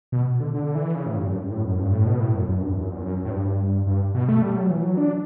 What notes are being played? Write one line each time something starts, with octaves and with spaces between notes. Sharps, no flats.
B2
D3
D3
E3
C#3
A2
G2
F#2
G2
A2
F#2
G2
A2
B2
A2
F#2
F#2
G2
E2
F#2
E2
F#2
A2
G2
G2
B2
A3
G3
F#3
E3
F#3
D4